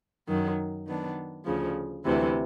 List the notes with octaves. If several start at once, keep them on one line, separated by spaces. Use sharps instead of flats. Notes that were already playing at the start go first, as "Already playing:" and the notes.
F#2 D#3 F#3
D#3 F#3 B3 D4
D2 C#3 F3
D2 C3 E3